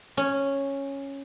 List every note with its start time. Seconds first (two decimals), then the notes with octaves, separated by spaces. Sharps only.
0.17 C#4